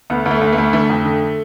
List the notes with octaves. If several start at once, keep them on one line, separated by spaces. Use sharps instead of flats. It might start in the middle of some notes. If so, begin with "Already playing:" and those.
D2 B3
D2
A3
D2
A3
D2
D3 A3
F2
D3